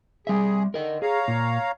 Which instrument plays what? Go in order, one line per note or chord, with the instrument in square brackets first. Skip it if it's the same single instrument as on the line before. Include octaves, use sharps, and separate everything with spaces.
[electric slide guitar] G3 E5 [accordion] G#4
[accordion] D3 [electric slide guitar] A#4 D#5
[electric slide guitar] G#4 [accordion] C#5 F5 A#5
[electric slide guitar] A#2